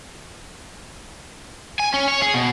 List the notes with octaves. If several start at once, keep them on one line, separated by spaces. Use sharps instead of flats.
G#5
C#4
C#5
G#4
B2